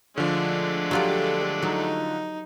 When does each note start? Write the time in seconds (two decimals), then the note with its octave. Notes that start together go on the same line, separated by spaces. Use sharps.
0.18 D3 F3 G#3 A3 D4
0.91 F#3 F4 G4 A4 D5
1.63 F#3 D#4